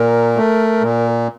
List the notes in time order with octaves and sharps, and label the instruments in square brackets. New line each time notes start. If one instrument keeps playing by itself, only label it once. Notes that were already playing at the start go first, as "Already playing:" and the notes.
Already playing: [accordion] A#2 [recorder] A#4
[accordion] A3
A#2